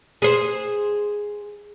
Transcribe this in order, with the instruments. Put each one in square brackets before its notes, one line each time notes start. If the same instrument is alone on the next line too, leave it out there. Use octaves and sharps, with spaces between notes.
[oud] G#4 C5